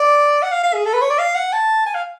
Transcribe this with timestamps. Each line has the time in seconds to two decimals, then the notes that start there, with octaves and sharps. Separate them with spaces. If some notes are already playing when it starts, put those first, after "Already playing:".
Already playing: D5
0.43 F#5
0.52 F5
0.63 F5
0.74 G#4
0.86 A4
0.94 B4
1.02 C#5
1.10 D5
1.19 F5
1.35 F#5
1.53 A5
1.86 G#5
1.95 F5